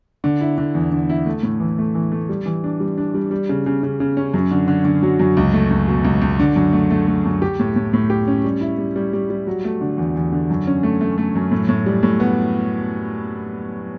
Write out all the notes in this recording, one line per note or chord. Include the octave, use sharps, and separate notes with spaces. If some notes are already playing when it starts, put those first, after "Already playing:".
D3
E4
D3
E2
D3
E4
A3
A2
E3
A3
E3
A3
G3
E3
D4
G3
D4
G3
G3
C#3
C#3
C#3
C#3
C#4
F#2
D3
D3
D3
F#3
F#2
C#2
A3
C#2
B2
C#2
C#2
D3
F#2
A3
A3
A3
F#2
G4
A2
A2
A2
G4
C#4
G3
E4
G3
G3
G3
G3
F#3
A3
D3
E2
E2
D3
F#2
C#4
A3
A3
A3
F#2
A2
A2
G3
A2
B3